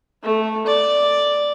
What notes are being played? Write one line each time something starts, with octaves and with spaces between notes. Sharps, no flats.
A3
D5